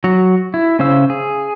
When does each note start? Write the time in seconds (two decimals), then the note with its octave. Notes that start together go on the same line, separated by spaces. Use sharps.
0.04 F#3 F#4
0.54 E4
0.79 C#3 C#4 C5 F5 E6
1.10 G#4